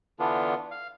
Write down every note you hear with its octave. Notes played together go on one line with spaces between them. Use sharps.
D3 E3 B3 D4 F4
F5